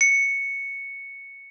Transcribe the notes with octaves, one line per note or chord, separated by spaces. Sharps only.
C#7